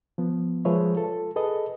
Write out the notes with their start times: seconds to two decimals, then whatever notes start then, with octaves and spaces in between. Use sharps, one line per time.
0.18 F3 B3
0.65 F3 G#3 G#4 B4 C#5 E5
0.96 F4 A4
1.36 G#4 A4 B4 D#5